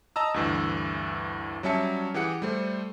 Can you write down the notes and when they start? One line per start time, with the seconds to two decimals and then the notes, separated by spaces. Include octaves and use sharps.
0.16 D#5 A5 A#5 E6
0.34 D2 G2 E3
1.63 F#3 G3 C#4 E5 A5 C#7
2.14 E3 G4 G#4 F#5 C#7
2.42 G3 A3 C5